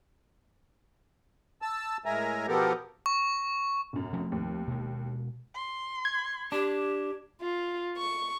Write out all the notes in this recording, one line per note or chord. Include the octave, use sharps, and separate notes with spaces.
A5 E6
A2 G#3 A#4 E5 G#5 A#5
B2 F3 B3 G4 A4 A#4
C#6
B1 F#2
F3 A3 C4
D#2
B2 G#3
C6
G#6
D4 G4
F4
C#6